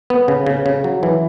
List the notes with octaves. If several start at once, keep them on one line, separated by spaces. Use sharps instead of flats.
B3
C#3
C#3
C#3
F#3
E3